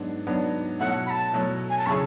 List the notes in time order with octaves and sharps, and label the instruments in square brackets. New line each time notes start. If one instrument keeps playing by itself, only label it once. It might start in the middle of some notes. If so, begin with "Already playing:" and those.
Already playing: [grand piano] G#2 F#3 B3 D4
G#2 F#3 B3 D4
[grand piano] B2 F#3 A3 E4 [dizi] F#5
[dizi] B5
A5
[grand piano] B2 F#3 A3 E4
[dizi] G#5
A5
[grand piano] C#3 F#3 C#4 E4 G#4 [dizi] C#6